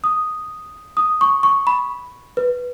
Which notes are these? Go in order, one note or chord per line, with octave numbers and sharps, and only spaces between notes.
D#6
D#6
C#6
C#6
B5
B4